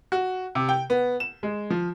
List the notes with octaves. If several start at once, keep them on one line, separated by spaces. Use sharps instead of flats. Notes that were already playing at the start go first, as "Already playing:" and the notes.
F#4
C3
G5
B3
E7
G#3
F3